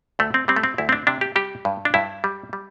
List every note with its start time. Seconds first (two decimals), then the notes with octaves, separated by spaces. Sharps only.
0.19 D2 A3
0.34 C4
0.48 G3 C4
0.56 A3
0.63 C4
0.78 D2 E4
0.89 C4
0.93 D4
1.07 C3 D4
1.21 G4
1.36 G3 G4
1.65 G2
1.85 D4
1.94 G2 E4
2.24 G3
2.53 G3